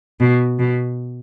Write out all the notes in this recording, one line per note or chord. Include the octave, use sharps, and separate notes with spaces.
B2
B2